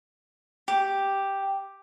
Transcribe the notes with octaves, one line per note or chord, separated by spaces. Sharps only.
G4